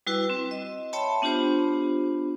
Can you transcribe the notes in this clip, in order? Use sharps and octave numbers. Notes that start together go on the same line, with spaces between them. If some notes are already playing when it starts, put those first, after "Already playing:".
G3 E4 F#4 B4 G5
C4
D#5
C#5 E5 G5 A5 B5 C6
B3 D4 F4 G4 C5